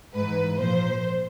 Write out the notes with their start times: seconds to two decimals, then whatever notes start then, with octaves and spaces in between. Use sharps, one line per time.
0.15 G#2 E3 B4
0.59 A#2 F3 C5